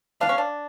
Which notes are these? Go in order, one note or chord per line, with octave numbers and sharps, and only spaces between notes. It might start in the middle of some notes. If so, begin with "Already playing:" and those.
D4 F5
C#4
D4